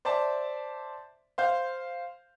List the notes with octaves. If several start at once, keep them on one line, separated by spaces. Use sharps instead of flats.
C5 D5 E5 A5
C5 F5 G6